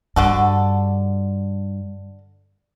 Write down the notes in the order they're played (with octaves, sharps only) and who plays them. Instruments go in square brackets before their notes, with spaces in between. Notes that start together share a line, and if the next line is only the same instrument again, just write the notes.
[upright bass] G2 [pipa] D3 F#4 A4